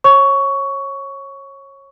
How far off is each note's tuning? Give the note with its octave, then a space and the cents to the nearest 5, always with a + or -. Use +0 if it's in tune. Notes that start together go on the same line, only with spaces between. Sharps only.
C#5 -25 C#6 +15